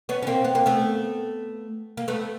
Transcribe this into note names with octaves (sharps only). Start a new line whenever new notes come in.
B3 C#4
C#4
A#3 C4
B3
A#3
A3 B3
A#3
A3 B3